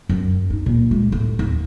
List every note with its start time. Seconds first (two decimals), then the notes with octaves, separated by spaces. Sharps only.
0.09 F#2
0.50 D#4
0.66 A#2
0.91 G#3
1.12 A2
1.39 D#2